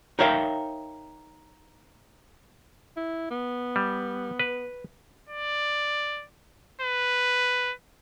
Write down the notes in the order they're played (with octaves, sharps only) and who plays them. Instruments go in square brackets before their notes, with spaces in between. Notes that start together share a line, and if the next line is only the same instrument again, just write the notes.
[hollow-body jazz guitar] D#4 A#4 C#5 E5 F5 G5
[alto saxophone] E4
B3
[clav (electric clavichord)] G3
B4
[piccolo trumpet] D5
B4